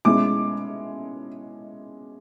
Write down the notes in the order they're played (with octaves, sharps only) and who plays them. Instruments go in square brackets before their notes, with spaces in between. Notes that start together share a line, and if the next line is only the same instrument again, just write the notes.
[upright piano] B2 G#3 C#4 E4 D6